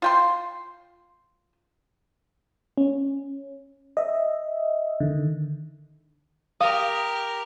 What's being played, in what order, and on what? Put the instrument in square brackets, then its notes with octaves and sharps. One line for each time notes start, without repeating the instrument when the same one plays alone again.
[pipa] F4 G5 C6
[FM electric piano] C#4
D#5 E5
D3 D#3
[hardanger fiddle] G4 A#4 [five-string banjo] F5 [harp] D#6